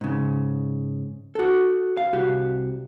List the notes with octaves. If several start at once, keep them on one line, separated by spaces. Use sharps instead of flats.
G#2 C#3
F#4 A4
F5
C2 F#4 G4